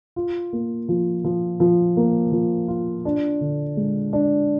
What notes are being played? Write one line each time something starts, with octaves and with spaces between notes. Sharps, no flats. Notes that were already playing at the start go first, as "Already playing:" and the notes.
F4
A#3
F3
F3
F3
A#3
F3
F4
D4
D3
G#3
D4